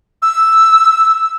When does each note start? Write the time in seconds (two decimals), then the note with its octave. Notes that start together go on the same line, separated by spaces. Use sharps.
0.22 E6